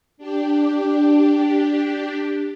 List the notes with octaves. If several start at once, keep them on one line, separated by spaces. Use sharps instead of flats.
D4 G4